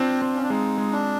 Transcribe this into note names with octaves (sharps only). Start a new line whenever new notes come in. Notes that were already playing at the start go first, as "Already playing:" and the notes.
Already playing: C4 D4 F4
C4
C#4
D4
G#3 D#4
G#3
D4